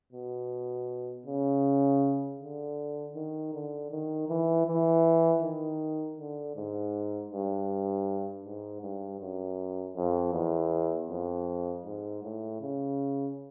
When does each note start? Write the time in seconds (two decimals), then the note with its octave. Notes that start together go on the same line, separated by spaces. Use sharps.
0.12 B2
1.26 C#3
2.39 D3
3.15 D#3
3.53 D3
3.91 D#3
4.29 E3
4.67 E3
5.42 D#3
6.18 D3
6.56 G#2
7.31 G2
8.45 G#2
8.82 G2
9.21 F#2
9.96 F2
10.33 E2
11.09 F2
11.85 G#2
12.23 A2
12.61 C#3